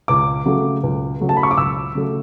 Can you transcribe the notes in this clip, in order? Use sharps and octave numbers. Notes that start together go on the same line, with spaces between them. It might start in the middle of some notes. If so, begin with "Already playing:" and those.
C#2 D6
C#3 F#3 A3
C#2
C#3 F#3 A3
A5
B5
C#6
D6
C#2 E6
C#3 F#3 A3